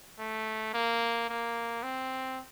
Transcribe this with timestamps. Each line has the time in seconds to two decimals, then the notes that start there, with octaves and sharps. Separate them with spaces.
0.19 A3
0.74 A#3
1.29 A#3
1.83 C4